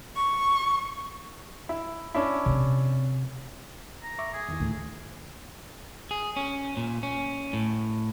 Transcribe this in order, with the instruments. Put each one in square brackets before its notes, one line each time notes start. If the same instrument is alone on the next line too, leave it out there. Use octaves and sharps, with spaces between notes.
[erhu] C#6
[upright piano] E4
C#4 D4 E4
[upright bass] C3 C4
[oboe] A#5
[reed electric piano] E5 C#6 D6
[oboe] G#4
[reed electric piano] E2 D#3 E3
[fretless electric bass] D2 A2
[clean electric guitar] G#4
C#4
A#2
C#4
A2